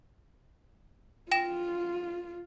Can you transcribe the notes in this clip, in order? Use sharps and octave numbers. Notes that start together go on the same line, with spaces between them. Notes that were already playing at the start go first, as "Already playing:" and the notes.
F4 G5 A#6 E7